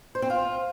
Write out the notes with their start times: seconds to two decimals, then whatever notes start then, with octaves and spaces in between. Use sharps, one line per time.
0.15 C5
0.22 C4
0.30 F4